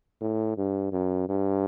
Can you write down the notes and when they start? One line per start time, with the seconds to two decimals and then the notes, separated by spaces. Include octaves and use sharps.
0.21 A2
0.57 G2
0.92 F#2
1.29 G2